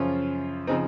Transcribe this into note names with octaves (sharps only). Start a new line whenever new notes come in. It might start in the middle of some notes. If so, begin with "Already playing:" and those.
Already playing: F#2 C#3 F3 C#4 F4
C#3 F3 C4 D#4